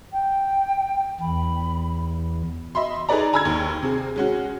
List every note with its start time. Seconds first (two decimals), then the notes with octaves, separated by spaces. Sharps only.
0.12 G5
1.20 E2 B5
2.75 D#5 E5 B5 C6
3.09 D#4 G#4 A4 B4 D5 A#5
3.33 G#5 A#5 B5 E6 F6 G#6
3.45 D#2
3.83 C3 G#4
4.16 G#3 C#4 F#4